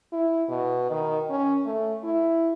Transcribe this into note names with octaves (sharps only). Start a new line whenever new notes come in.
E4
B2
D#3
C#4
A3
E4